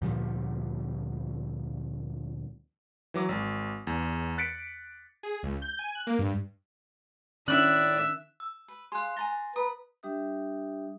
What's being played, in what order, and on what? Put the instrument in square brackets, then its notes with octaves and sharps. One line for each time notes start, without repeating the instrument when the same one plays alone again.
[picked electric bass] D2 A#2 F3 G3
[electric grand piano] E3 F#3 D6
G#1
E2
F#6 A6 B6 C#7 D7
[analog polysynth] G#4
C#2
G6
G#5
F#6
A#3
G2
[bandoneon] A2 D5 [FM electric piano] D#3 C#4 D4 [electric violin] E5 [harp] F#6
[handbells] E6
[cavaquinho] B4
[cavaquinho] G#4 F5 [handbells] C6 F#6
[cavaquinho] G#5 A#5 C6 [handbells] A6 A#6
[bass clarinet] B4 [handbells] A#5 [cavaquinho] D#6
[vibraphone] G3 D4 G4 E5 D#6